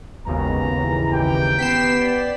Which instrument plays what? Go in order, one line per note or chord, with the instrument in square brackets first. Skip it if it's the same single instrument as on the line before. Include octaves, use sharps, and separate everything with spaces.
[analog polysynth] G#1 D#2 C#3 [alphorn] B3 [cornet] A#5
[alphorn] E3
[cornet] G4 [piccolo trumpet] G5
[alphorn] B3 [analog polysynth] B6 C7 E7
[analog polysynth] D5